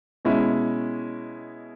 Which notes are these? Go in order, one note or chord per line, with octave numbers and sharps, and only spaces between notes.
B2 G#3 C#4 E4